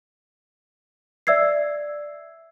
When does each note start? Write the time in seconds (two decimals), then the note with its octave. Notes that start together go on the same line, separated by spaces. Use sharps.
1.27 D5 E5 E6 G#6 C7